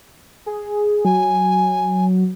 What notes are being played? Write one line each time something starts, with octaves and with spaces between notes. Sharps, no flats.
G#4
F#3 G#5